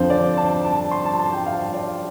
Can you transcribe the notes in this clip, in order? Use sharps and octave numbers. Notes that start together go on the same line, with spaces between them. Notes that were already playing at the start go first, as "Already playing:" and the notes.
Already playing: F2 D3 F3 C5
D5
A5
A5
C6
A5
A5
G5
F5
D5